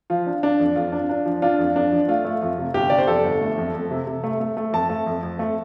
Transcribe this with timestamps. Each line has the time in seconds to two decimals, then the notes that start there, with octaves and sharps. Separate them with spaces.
0.10 F3 F4
0.26 D4
0.43 D4
0.59 F2
0.76 F2 F4
0.92 D4
1.09 D4
1.26 F3
1.42 D4 F4
1.59 F2
1.75 F2 D4
1.92 F3
2.08 A3 F4
2.25 A3
2.41 F2 F4
2.58 C3
2.74 G1 G4
2.90 C3 D5
2.98 C5
3.07 F2 A4
3.24 G1
3.41 A3
3.57 F2
3.74 F2
3.91 C3
4.07 C3
4.24 A3
4.40 A3
4.57 A3
4.73 F2 A5
4.90 A3
5.06 F2
5.22 F2
5.39 A3